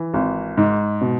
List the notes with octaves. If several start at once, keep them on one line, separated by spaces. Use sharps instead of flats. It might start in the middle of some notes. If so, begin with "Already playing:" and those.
Already playing: E3
G#1
G#2
B2